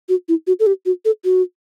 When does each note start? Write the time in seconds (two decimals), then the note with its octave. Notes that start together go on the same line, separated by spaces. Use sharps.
0.09 F#4
0.28 E4
0.47 F#4
0.60 A4
0.66 G4
0.86 F#4
1.05 A4
1.24 F#4